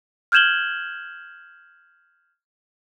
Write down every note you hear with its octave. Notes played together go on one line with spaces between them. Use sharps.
F6 G6 G#6 E7 F#7 G7